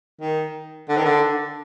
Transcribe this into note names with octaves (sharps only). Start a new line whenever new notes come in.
D#3
D3
D#3
D3